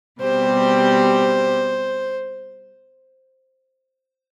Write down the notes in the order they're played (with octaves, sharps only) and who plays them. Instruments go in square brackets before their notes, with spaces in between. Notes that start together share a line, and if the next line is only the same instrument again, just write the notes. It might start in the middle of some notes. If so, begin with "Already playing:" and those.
[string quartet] B2 G3 C4 G4 [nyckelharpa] C5